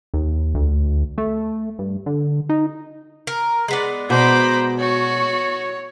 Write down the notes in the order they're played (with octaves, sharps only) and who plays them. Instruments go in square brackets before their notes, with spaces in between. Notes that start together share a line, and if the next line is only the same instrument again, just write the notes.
[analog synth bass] D#2
D2
A3
G2
D3
D#4
[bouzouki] A#4
G#3 B3 D5
[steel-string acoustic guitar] B2 [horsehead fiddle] C5 A#5 [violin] B5 D6
[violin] F#4 [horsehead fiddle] C#5